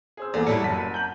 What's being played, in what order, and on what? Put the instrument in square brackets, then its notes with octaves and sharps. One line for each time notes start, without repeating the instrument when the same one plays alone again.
[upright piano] G#4 C5 E6
[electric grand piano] E2 [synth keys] A#3 A4 F#5 [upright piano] D5 F5
[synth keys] A2 C#7 [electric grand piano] F#3 G3 E4 [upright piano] A4
[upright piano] F#1 F#2 [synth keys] F#5 D#7 [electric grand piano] A5 B6
[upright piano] A#5 G6 F#7